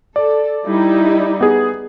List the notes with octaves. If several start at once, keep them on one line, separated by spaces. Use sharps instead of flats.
A4 D5
G3 D#4 E4
B3 G#4